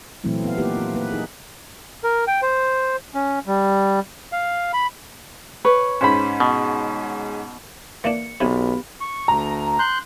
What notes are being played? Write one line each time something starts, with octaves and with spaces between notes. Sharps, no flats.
A#2 E3 F#3 A3 C4 E4
B3 F5
A#3 D#4 F4 G4 A#4 B4
F4
A#3 B4
D#4 G#4
A#4
G5
C5
C#4
G3
F5
B5
B4 C#5
G#2 C#4 C5 B5
B2
E3 A#3 D4 C#7
B1 C3 B3 G4 G#5 B5
C#6
D2 A#5
C6 F#6 G6